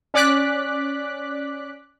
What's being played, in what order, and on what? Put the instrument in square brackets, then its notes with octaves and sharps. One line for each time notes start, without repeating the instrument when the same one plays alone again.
[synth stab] C#4 D5 D6 F#6 B6